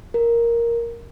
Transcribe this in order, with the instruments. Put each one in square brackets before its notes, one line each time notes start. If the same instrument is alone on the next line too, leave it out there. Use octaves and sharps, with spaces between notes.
[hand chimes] A#4